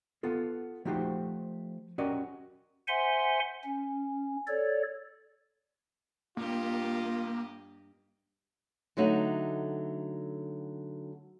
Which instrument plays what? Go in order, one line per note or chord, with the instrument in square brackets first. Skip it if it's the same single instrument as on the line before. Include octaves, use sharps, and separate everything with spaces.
[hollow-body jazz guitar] B3 F4 A4
F3 A3 D#4 F#4 G4 C5
C#4 F#4 G4 A#4 D5 D#5
[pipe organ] C5 E5 F#5 G#5 C6
C#4
A4 C#5 D5
[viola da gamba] G2 G4 D#5 [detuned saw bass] A#3 [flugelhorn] F4
[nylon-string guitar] D3 F#3 A3 D#4